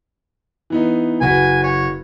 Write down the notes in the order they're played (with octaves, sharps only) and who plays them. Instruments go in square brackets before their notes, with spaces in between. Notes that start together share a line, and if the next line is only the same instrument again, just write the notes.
[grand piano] E3 B3 D#4
[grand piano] F#1 F#4 B4 [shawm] G#5
[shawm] C#5